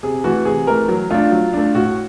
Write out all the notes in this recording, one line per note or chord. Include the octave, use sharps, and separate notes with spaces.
C3 G#4
E3 A3 F#4
C3 G#4
E3 A3 A#4
F#3
A3 D4 F4
F#3
A3 D4
A2 F#4